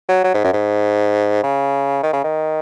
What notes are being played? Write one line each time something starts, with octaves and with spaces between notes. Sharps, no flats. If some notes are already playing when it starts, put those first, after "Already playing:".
F#3
F#3
G#2
F#2
G#2
C#3
D#3
C#3
D#3